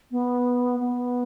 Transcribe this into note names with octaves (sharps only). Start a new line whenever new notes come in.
B3
B3